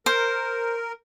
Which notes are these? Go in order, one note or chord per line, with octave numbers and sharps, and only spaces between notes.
A#4 C5